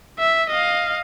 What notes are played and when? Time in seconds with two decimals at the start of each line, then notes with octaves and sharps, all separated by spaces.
0.19 E5
0.50 D#5 F5